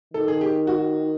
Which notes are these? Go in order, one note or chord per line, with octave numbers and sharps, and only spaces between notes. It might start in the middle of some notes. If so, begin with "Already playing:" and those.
D#3 A4
G#4
G4
F#4